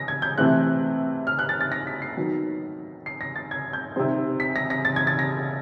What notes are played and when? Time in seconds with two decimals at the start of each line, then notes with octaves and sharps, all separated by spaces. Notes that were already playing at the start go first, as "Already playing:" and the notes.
Already playing: A#6
0.08 G#6
0.22 G6
0.38 C3 E3 A3 C4 F#6
1.27 F6
1.39 F#6
1.49 A6
1.61 A6
1.72 A#6
1.87 B6
2.02 C7
2.17 D#3 F#3 B3
3.06 C7
3.21 A#6
3.36 A6
3.51 G#6
3.73 G6
3.96 C3 D#3 G3 C4
4.40 B6
4.56 A#6
4.70 A#6
4.85 A6
4.96 G#6
5.07 A6
5.19 A#6